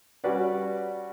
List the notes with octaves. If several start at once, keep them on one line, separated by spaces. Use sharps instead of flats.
G3 C#4 F#4 B4 D5